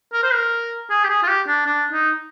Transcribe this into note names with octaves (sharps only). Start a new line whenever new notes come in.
A#4
C5
A#4
G#4
G4
G#4
F4
G4
D4
D4
D#4